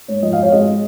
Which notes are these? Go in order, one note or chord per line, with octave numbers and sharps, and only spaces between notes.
G#2 C#5
F3 D#5
F5
G#1
C#5
G#3 D#5